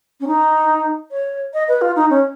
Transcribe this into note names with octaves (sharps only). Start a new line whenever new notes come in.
C#4
D#4
C#5
D#5
B4
F4
D#4
C#4